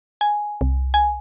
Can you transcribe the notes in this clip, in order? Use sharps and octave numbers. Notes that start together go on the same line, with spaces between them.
G#5
C2
G#5